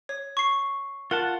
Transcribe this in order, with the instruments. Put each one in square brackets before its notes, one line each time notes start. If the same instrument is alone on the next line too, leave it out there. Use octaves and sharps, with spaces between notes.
[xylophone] C#5
C#6 C7
[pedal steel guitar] F4 F#5 A5 [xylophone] A#4